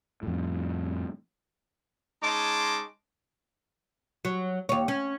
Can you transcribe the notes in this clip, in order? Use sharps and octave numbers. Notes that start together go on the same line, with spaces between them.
F2 A2
G#3 C#4 D#4 A5 C6 D6
F#3
D#2 C#5
C#4